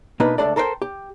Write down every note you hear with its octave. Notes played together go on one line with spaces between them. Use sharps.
B2 A#3 D4 D#4 B4
C#2 D#3 A3 D4 A4 D5
A4 A#4 C5 D#5 G5
G4